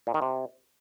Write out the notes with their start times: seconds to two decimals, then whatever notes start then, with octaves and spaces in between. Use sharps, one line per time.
0.07 A#2
0.14 D#3
0.22 C3